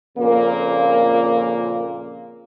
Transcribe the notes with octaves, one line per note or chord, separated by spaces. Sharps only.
F2 A#2 C#3 A#3